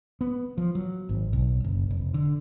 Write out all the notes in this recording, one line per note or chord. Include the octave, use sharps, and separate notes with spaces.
B3
F3
F#3
G#1
B1
F#1
F1
D3